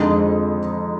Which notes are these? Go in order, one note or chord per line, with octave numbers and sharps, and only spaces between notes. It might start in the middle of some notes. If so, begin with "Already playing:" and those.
Already playing: F2 D3 G#3 D#4